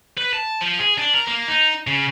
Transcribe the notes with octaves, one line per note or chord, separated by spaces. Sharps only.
B4
A5
F3
G#4
D4
A#4
A#3
D#4
C#3